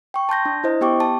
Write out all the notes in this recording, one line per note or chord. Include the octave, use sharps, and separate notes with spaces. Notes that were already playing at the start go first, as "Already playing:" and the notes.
G5 C#6
A5 C6 G6 A#6
D4
E4 C5 D#5
B3 G4 G5 C#6 D6
A5